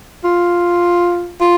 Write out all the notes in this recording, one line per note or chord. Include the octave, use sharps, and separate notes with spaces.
F4
F4